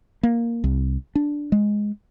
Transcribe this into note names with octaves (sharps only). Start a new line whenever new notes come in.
A#3
C2
D4
G#3